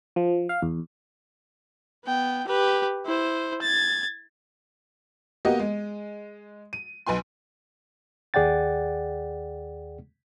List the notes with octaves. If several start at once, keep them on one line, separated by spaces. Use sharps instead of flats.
F3
F5
E2
B3 G5
G4 B4
E4 C5
G#6 A6
A#3 B3 F#4 G4 D#5
G#3
D#7
B1 B4 G#5 C6
D#2 G#4 D5 F#5 G5 A6